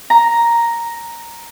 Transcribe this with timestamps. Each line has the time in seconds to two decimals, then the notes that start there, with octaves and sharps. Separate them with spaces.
0.10 A#5